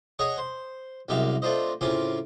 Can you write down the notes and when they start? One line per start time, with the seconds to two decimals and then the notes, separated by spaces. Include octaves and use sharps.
0.19 G#4 C#5 D#5 F#5
0.38 C5
1.09 C2 F#2 G#3 G4 E5 F5
1.42 A3 C4 D4 F4 C5 D#5
1.81 A2 C#3 C4 F4 G#5 D6